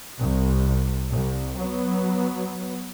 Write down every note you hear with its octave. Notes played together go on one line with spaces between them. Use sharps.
C2
C2
F#3 B3